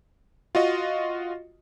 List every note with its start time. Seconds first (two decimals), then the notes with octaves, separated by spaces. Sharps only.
0.55 F4 F#4 D#5